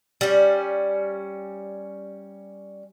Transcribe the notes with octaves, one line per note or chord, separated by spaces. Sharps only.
G3 C#4